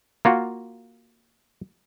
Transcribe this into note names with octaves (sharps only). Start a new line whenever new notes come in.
A#3 F4 F#4